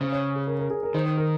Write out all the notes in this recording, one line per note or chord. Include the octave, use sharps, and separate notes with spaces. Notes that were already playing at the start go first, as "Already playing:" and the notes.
C#3 C5
C#5
G#4
A#4
A#4
G#4
A#4
D#3 C5
C5
A#4